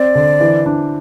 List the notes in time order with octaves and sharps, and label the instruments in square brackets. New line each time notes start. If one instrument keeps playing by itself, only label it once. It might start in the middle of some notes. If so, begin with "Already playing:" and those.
Already playing: [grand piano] C4 [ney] D5
[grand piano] D3
E3
D4